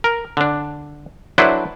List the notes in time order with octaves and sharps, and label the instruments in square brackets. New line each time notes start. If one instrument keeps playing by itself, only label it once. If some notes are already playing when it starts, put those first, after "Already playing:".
[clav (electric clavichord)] A#4
D3 D4
F#3 D4 E4 A4 B4 C5